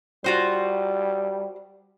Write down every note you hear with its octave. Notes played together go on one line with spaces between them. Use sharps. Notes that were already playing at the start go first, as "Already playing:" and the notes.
G3 F4 F#4 C5